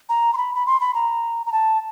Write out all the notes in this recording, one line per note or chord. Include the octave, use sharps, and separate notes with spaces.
A#5
C6
B5
B5
C6
B5
A#5
A#5
A5